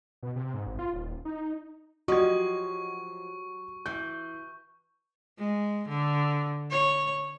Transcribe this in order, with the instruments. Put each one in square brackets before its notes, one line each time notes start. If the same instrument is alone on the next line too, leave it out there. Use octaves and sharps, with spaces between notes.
[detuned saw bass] B2
C3
G#2
G#1
F4
D#1
D#4
[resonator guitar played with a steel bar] F3 D#5 [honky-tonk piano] F#3 G#6 [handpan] F#4 G4 [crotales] C#6
[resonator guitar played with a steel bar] E3 [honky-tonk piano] G6
[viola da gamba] G#3
D3
C#5